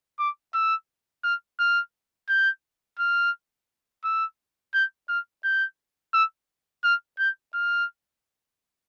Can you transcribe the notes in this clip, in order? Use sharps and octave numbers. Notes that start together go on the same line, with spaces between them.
D6
E6
F6
F6
G6
F6
E6
G6
F6
G6
E6
F6
G6
F6